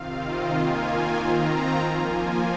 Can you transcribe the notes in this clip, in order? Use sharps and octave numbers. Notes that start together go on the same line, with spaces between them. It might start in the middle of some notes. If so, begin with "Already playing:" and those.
Already playing: C3 D#3 C4 F4 F5
D#5
D#3 A#3 F4 G#5
D#3 C4 F4 A#5
F3 A#3 F4 G#5